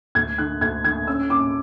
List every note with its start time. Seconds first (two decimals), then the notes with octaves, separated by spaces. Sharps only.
0.15 D2 G#6
0.38 D3 F#6
0.61 D2 G#6
0.84 D3 G#6
1.07 C#4 E6
1.30 C#4 D6